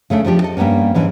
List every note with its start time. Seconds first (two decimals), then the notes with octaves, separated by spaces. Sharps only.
0.10 C#3 A3 C#4 D4
0.25 F3 G3 D4 G4
0.42 A4 D#5
0.57 G2 G3 A#3 B3 C#4
0.95 G#2 E3 C#4 D4